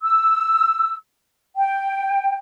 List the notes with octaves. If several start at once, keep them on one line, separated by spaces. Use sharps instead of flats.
E6
G5